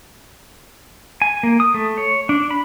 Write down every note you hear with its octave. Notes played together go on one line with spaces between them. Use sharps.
G#5
A#3
D#6
A3
C#5
D4
B5